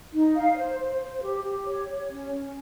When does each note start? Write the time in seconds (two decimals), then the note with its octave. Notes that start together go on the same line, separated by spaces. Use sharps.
0.13 D#4
0.35 F5
0.57 C5
0.79 C5
1.01 C5
1.23 G4
1.45 G4
1.67 C#5
1.89 C#5
2.10 C#4
2.32 C#4